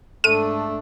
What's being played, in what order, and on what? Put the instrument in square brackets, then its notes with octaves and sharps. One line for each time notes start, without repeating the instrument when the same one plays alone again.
[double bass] G#2 D4 [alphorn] A3 [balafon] A4 [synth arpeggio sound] D#7